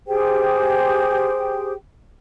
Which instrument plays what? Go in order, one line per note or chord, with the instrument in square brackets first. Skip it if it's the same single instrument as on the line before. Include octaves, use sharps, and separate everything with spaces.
[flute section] G4 G#4 C5 G5